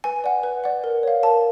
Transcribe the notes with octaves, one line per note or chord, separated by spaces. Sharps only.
B4 G#5
D5 F#5
B4
D5 F#5
A#4
C#5 F5
A#4 A5